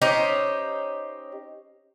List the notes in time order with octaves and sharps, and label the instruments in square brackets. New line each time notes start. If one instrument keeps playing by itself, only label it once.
[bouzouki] C#4 D#4 G4 C5